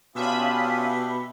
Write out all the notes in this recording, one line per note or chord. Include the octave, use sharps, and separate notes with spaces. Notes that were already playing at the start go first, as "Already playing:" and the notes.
B2 C#4 D4 F4 G4 E5 B5 D#6